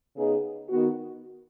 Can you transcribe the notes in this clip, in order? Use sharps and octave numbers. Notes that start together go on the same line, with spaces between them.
C#3 B3 D#4 G#4
D#3 B3 F#4